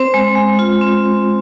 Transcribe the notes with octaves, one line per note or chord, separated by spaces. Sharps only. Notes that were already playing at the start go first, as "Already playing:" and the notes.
Already playing: C4 C5
G#3
G#3
F4
C4